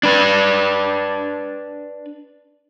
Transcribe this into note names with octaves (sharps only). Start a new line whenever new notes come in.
D4 B4